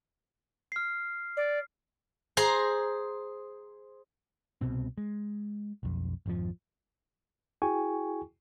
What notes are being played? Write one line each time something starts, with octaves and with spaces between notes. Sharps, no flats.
F6 C7
D5
G#4 C5 A#5
C2 B2 C4
G#3
B1 F2
G#1 F2 F3
E4 F#4 G#4 G5 G#5 C#6